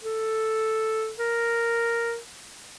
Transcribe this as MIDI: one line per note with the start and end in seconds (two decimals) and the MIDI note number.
0.03 1.12 69
1.18 2.17 70